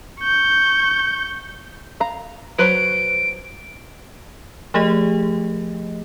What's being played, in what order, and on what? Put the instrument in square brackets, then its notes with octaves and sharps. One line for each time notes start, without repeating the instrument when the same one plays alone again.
[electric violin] C#6 G6
[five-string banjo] F5 A#5
[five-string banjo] F#3 B4 C5 [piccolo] D7
[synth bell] F3 A3 G4 G#4 D#5